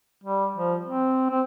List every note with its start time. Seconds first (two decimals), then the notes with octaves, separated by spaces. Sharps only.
0.24 G3
0.56 F3
0.85 C4
1.30 C4